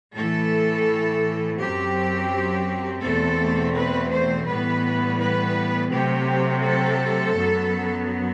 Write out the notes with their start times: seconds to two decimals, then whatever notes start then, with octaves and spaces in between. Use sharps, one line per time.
0.14 A2 E3 A3 A4
1.58 F#2 F#3 C4 G4
3.02 E2 B2 A3 C4 A4
3.74 B4
4.10 C5
4.46 A2 E3 G3 B3 B4
5.18 B4
5.90 C3 F#3 A3 C4 G4
6.62 A4
7.34 F#2 F#3 B3